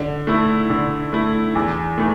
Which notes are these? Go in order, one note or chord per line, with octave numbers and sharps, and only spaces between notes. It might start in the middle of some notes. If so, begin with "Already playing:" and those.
Already playing: D3
A3 E4
D3
A3 E4
E2
E3 A3